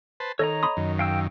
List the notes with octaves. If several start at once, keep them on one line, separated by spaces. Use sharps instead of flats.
B4 C5 A5
D#3 A4 C#5 D#5 A#5
B5 C6 D#6
F#2 D#3
F5 G5 E6